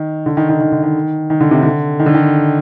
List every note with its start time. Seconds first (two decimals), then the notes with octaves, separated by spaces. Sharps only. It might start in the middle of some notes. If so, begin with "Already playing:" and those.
Already playing: D#3
0.26 D3
0.37 D#3
0.49 D#3
0.60 D#3
0.72 D3
0.83 D#3
1.30 D#3
1.41 D3
1.51 C3
1.63 D3
1.99 D#3
2.06 D3
2.14 D#3